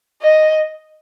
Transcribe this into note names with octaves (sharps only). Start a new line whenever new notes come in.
D#5